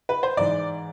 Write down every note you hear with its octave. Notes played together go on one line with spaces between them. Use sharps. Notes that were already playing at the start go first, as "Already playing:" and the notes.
B4
C5
G#2 E3 D5